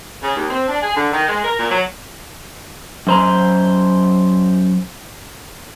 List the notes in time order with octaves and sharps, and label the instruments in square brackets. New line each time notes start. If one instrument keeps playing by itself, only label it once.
[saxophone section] C#3
D#2
C4
D4
G#4
D3
D#3
G#3
A#4
A#2
F#3
[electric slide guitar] F#2 C5 A#5